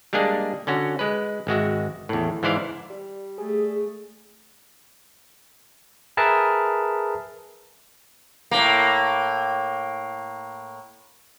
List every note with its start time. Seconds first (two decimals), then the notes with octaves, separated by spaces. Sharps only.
0.13 G3 G#3 A#3 D4 G#4
0.67 D3 C#4 F#4
0.99 G#3 B4
1.47 G#1 G#3 F#4 E5
2.09 E2 A2
2.43 G#2 E3 E4 C5 D5 F5
2.90 G3
3.38 A3 G#4
6.17 G#4 A#4 B4 E5 A5
8.51 A2 A#3